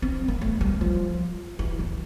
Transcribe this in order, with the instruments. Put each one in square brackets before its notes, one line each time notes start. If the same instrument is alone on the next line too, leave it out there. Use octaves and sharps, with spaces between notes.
[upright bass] C4
A#3
A3
G3
F3
E3
F2